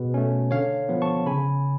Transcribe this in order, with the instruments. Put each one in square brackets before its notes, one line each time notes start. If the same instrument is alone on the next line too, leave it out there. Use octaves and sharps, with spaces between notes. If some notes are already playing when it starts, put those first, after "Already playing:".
Already playing: [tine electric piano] B2 G#4 B4
A3 C#4
D3 C#5 F5
F3 B3
A5 C#6
C#3 G#5 B5